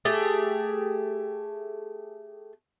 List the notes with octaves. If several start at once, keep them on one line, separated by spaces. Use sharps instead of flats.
A3 G4 G#4